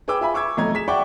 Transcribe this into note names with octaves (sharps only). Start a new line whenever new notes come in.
G#4 B4 G5 D6 E6
F4 E5 G#5 B5
C#6 D6 E6 G#6
B1 F2 A3 D#5 A#5 G#6
G#4 B6 E7
D5 E5 F#5 G5 C#6 D6